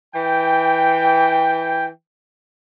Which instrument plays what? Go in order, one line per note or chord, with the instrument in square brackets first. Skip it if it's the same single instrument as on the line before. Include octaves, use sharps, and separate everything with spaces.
[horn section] E3 G5